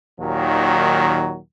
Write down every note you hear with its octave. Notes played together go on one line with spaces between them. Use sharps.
D#2 A#2 D#3 F#3